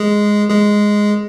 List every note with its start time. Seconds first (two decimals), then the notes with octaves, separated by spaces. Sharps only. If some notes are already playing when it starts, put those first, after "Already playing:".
Already playing: G#3 G#4
0.50 G#3 G#4